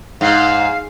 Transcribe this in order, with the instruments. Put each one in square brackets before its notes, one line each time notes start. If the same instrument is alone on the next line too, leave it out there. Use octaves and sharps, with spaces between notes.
[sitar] G#2 [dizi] F5